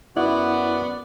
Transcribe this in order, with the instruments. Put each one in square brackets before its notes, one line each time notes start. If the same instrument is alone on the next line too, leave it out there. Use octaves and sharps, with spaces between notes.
[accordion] F#2 F#4 F#6 [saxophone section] B3 [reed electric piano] E4 [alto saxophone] D5